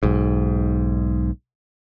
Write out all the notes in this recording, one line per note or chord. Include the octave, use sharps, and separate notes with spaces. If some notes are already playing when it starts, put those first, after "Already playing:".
B1 G#2